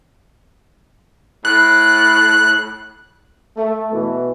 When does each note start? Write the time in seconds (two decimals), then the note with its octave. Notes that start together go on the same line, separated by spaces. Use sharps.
1.45 A2 F#6
3.56 A3
3.92 B2 E3